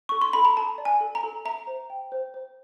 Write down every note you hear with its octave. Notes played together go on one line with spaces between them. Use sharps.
A4 C#6
C6
A4 B5
A#5
A4 A5
D5
G#5
A4
A#5
A4
E5 A#5
C5
G5
C5
C5